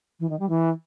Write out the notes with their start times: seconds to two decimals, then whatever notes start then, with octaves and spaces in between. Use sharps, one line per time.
0.20 E3
0.30 D#3
0.39 G3
0.49 E3